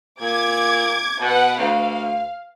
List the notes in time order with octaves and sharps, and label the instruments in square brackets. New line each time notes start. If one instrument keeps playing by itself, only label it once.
[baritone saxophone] A#2 [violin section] D6 G#6
[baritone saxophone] B2 [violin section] B4 F#5
[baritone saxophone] D2 [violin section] F5